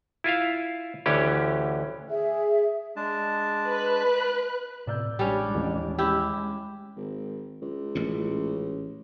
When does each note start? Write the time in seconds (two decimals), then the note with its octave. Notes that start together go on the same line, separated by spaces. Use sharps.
0.24 E4 F4 E5 F5
1.06 D2 D3 E3 C#4 G4
2.09 G#4 E5
2.96 G#3 D4 A5
3.67 B4 F#6
4.87 A2 C3 D5 E6 G6
5.19 A1 G3 G#3 C#4 D4
5.55 A1 D#2
5.98 G#3 E4 G4
6.97 G#1
7.62 C#2
7.95 A1 A#2